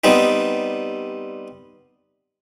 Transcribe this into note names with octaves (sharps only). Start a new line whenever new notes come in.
G3 B3 C4 D#4